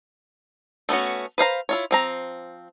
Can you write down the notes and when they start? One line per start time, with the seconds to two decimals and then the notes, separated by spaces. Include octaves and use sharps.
0.89 A3 B3 C#4 F#4
1.38 B4 C5 F5 A#5
1.69 E4 F4 C#5
1.91 F3 C4 A#5